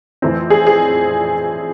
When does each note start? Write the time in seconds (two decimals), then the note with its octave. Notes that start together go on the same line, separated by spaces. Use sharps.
0.22 F2 E3 A3 C4
0.50 G#4
0.67 G#4